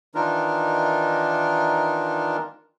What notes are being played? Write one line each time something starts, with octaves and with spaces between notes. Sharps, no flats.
D#3 E3 D4 D#4 F4 A#4